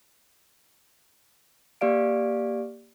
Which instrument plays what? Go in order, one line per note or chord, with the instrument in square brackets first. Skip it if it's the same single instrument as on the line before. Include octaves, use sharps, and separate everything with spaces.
[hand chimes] A#3 G4 D5 F5 D7